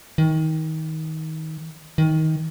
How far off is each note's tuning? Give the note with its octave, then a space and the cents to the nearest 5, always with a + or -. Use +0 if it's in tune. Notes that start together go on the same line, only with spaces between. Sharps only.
D#3 +25
D#3 +20